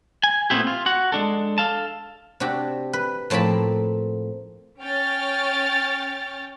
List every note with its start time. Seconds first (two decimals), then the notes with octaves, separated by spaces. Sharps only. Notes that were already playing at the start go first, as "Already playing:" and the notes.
0.24 G#5
0.50 A#2 A3 B3 C4 E4 G4
0.67 F4
0.86 F#4 F#5
1.12 G#3 D4 A4
1.58 A4 F5 A5
2.40 C3 D4 F#4 G4
2.93 B4
3.30 A2 F3 A#3 C4 A5 B5
4.81 C#4 G5 C#6 F6 A6